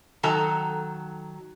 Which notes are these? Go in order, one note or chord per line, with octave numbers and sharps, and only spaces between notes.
D#3 F#3 A4 A5 A#5